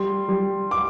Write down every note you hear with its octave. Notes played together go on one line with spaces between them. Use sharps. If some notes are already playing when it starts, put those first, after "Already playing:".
Already playing: G3 C6
G3
D6